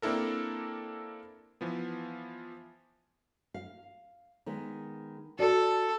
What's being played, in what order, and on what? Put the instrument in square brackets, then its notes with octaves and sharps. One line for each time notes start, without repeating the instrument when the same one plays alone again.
[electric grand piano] A#3 C4 D4 E4 A4 A#4
E3 F3 B3
[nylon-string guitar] F5
D#3 G#3 B3
[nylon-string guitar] F#4 D5 [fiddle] A4